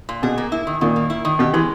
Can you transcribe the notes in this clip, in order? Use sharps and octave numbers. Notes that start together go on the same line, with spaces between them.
A#2
B2 G#4
A#3
E4
D#3
A#2 D#3
A#3
E4
D#3
B2 G4
E3 G#3